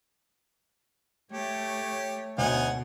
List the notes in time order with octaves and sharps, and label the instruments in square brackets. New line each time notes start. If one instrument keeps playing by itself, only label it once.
[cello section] A3 C#5 [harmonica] G4
[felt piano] D2 C#5 [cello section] B2 [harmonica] D#4 F#5 G#5